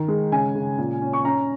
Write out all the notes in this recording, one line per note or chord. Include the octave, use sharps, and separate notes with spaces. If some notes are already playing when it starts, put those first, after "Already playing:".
Already playing: D#3
G#3
C#3 G#5
C#3
A#2
C#4
C#6
C#4 A#5